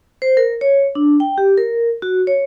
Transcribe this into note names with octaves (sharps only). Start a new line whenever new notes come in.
C5
A#4
C#5
D4
G5
G4
A#4
F#4
C#5